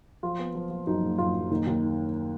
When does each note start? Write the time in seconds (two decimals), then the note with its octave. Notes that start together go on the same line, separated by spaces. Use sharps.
0.23 F3 F4
0.39 B3
0.55 F3
0.70 F3
0.87 F#2 D#4
1.03 F#1
1.18 F#1 F4
1.35 F#1
1.51 D#2 D#4
1.67 D#2
1.82 D#3